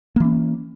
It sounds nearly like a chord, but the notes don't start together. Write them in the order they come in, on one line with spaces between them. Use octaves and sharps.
A#3 E3 C#4